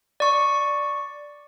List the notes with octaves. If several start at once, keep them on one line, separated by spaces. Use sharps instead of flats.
D5 C#6